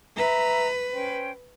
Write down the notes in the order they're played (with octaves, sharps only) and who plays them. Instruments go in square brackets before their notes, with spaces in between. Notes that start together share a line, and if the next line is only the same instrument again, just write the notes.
[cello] B4 [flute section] E5 A#5
[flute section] C#4 C5 G5